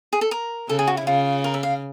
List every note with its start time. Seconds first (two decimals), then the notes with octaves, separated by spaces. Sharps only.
0.13 G#4
0.21 A4
0.31 A#4
0.69 C#3 A4
0.79 G#4
0.87 F#4
0.97 E4
1.06 C#3 F4
1.44 A#4
1.54 E5
1.63 F5